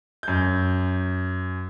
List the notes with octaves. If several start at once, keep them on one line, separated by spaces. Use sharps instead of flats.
F#2 G6